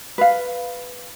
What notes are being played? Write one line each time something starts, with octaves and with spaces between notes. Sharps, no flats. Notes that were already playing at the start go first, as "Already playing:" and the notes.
B4 F5